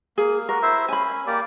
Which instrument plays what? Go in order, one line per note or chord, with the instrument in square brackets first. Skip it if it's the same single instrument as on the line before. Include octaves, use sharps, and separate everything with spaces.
[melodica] A#3 [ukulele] G#4
[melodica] F#4 [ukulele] A#4
[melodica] E4 C5 E5
[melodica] C#4 [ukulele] G#5 B5
[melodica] A#3 G4 D5